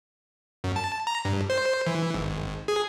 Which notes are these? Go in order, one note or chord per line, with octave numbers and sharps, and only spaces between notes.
F#2
A5
A#5
G2
C5
E3
G#1
G#4